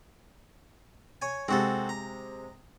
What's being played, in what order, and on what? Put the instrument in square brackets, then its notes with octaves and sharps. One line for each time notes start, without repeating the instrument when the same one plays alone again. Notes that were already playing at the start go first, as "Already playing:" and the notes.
[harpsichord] C#5 G#5
[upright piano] C3 G#3 [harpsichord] C4 F#4 A4
[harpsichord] A#5